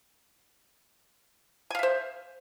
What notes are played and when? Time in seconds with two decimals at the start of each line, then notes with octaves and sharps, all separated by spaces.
1.70 G#5
1.75 F5
1.79 E5
1.83 C5